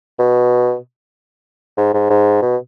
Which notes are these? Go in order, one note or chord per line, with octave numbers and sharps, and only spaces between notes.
B2
G#2
G#2
G#2
B2